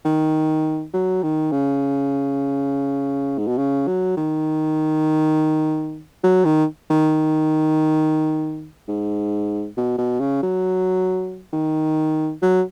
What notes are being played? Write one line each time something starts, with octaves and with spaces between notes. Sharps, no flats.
D#3
F#3
D#3
C#3
G#2
B2
C#3
F#3
D#3
F#3
D#3
D#3
G#2
B2
B2
C#3
F#3
D#3
F#3